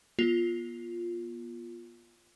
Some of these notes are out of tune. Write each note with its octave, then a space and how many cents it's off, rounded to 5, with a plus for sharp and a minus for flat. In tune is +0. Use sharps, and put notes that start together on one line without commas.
B3 -40 F4 +0